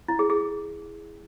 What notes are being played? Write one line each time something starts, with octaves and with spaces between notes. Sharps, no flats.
E4
G#4
G#4